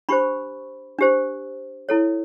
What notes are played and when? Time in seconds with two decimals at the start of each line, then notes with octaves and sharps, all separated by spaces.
0.09 D4 G4 C5 B5 C#6
0.99 D4 G4 C5
1.89 E4 A4 C#5